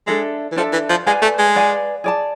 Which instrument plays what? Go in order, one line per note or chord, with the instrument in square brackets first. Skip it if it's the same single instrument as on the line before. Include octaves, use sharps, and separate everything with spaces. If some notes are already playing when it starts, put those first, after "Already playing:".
[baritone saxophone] G#3 [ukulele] D4 A4 E5
[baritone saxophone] E3
[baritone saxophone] F3 [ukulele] D4 A4 E5
[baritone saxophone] E3
F3
[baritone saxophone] G#3 [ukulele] B4 D5 F5 G#5
[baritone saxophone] A3
G#3
[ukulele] B4 D5 F5 G#5
G#4 D5 A5